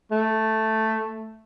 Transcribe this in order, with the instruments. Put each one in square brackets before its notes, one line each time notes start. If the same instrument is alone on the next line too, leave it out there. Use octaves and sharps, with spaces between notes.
[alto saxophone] A3